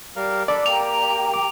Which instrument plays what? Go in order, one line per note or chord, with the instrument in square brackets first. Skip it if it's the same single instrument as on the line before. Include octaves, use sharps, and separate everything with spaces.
[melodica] G3 A#4 F5
[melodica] D4 A4 B5 [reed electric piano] D5
[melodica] A#3 [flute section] G4 G5 A#5 [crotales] F7
[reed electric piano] D6